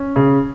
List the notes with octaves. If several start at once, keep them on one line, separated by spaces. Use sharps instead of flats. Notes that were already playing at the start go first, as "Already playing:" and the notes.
Already playing: C#4
C#3